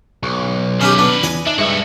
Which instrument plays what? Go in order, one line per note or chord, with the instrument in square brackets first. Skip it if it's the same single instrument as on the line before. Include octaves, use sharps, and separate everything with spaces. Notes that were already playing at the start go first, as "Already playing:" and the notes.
[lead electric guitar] B1 [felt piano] C#6
[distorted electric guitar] D#3 B4 [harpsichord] C#4 D#4 G4
[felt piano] B3 C#4 [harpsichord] D4
[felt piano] E2 [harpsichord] D#5 G#5
[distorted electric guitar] D4 [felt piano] D#4 E5
[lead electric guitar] G2 [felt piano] G#3 E5 E6 [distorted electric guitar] F#4 A4